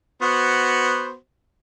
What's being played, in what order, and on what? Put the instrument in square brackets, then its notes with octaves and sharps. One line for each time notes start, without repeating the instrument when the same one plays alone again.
[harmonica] B3 F#4 C5